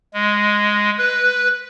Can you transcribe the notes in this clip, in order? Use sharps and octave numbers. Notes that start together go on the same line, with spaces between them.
G#3
B4